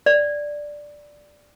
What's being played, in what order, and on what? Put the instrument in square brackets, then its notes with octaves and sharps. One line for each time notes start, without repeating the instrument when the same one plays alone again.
[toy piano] D5